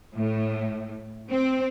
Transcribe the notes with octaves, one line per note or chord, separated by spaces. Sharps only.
A2
C4